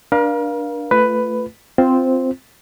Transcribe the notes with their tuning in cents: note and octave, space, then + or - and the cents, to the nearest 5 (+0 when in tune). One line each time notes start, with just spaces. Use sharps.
D4 +0 A#4 +40 F5 +0
A3 +10 F4 -25 B4 +10
C4 -5 F4 +0 C5 +0